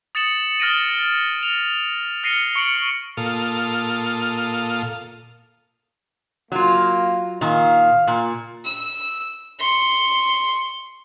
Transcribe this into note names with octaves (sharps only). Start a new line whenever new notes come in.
D#6 A6 C#7 E7 F#7
D#6 F6 A6 A#6 D7 D#7
F7
F6 A#6 C7 C#7 D#7
C#6 C#7 D7 F#7
A#2 A4 F5 D#6 F6
F#3 A#3 F4 F5
A#2 D#3 F5
A#2
E6
C6 C#6